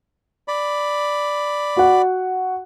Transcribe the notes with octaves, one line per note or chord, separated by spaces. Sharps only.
D5 B5
F#4 F#5